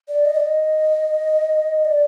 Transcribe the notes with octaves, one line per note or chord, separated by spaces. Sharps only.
D5
D#5
D5
D#5
D5